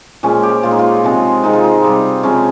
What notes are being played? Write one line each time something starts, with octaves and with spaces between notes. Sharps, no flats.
A#2 F3 G#3 C#4
G4
A#2 G#3 F4
D#4
F4
C3 F3 G#3
C3 D#3 G#3 D#4
F4
D#4
C3 G3
C3 F3 G#3 C#4